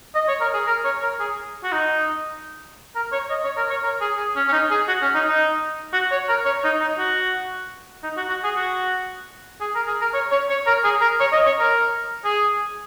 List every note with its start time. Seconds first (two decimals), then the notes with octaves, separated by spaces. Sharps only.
0.15 D#5
0.28 C#5
0.41 A#4
0.54 G#4
0.67 A#4
0.85 C#5
1.03 A#4
1.20 G#4
1.64 F#4
1.72 D#4
2.96 A#4
3.12 C#5
3.30 D#5
3.44 C#5
3.57 A#4
3.70 C#5
3.83 A#4
4.01 G#4
4.17 G#4
4.36 C#4
4.48 C#4
4.52 D#4
4.71 G#4
4.88 F#4
5.02 C#4
5.14 D#4
5.28 D#4
5.93 F#4
6.11 C#5
6.29 A#4
6.45 C#5
6.64 D#4
6.80 D#4
6.99 F#4
8.03 D#4
8.17 F#4
8.30 F#4
8.44 G#4
8.56 F#4
9.61 G#4
9.75 A#4
9.87 G#4
10.01 A#4
10.14 C#5
10.31 C#5
10.50 C#5
10.67 A#4
10.84 G#4
11.01 A#4
11.20 C#5
11.32 D#5
11.46 C#5
11.59 A#4
12.25 G#4